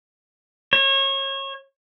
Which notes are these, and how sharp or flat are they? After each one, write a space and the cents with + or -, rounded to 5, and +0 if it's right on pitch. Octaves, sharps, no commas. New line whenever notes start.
C#5 -30